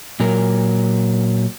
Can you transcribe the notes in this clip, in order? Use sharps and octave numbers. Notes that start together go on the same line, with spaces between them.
A#2 F#3 A#4